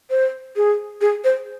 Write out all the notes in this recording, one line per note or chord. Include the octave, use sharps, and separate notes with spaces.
C5
G#4
G#4
C5